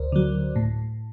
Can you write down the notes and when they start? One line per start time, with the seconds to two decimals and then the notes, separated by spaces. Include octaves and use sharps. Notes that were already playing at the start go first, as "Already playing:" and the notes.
Already playing: D2 A#4 C5 D5
0.12 D3 F#3
0.56 A2